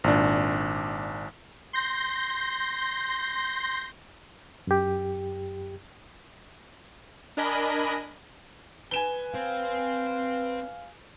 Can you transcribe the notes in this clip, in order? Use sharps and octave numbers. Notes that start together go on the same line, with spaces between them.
G#1 A#2 D4
C6 G6 A#6
F#2 G4
D4 A#4 D#5 G#5 B5 A#6
B4 G#5 E7 G7
C4 F5